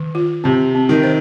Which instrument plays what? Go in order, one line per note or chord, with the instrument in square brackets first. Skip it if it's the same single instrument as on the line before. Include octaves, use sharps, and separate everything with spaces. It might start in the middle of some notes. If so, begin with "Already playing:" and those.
Already playing: [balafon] D#3
F4
[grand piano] C3 [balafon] C4
[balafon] C4
[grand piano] D#3
[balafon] C5